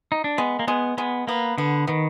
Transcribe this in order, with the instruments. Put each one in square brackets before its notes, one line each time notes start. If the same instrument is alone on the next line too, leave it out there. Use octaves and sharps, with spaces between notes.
[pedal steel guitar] D#4
D4
[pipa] G#3 [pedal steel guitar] B3
[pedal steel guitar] A#3
[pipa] G#3 [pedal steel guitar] B3
[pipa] G#3 [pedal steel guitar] B3
[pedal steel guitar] A#3 [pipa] B3
[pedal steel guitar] D3 [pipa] B3
[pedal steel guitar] D#3 [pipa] B3